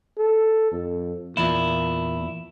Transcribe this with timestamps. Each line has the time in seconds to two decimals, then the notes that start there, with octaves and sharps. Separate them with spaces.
0.18 A4
0.72 F2
1.37 E2 A#2 E4